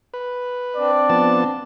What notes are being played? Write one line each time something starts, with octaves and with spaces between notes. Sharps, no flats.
B4
C4 D4 D5
F3 B3 A5